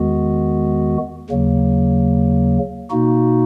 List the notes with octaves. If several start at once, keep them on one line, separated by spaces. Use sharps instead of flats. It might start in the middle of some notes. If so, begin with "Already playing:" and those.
Already playing: E2 D#3 G#3 B3 F#4
D#2 C#3 F#3 A#3
B2 A#3 D#4 F#4